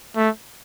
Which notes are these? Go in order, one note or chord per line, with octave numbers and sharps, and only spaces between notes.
A3